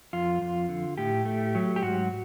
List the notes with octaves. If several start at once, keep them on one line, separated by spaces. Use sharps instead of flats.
F2 F4
F2
D3
A2 G4
A3
F#3
G4
G#2 F#4